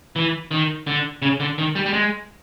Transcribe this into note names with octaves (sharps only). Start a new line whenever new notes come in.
E3
D#3
D3
C#3
D3
D#3
G3
G3
G#3